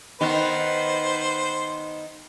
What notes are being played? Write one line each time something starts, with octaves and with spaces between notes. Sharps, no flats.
D#3 B3 B4 C5